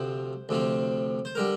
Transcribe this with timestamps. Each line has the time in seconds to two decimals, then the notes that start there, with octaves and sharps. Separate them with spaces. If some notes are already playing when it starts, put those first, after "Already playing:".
Already playing: D2 C3 F3 C5
0.49 D2 C3 F3
1.25 C5
1.35 D3 G3 A#4